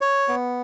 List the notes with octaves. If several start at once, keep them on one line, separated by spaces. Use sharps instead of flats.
C#5
B3